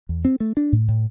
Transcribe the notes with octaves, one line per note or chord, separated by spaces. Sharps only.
E2
C4
A3
D4
A2
A2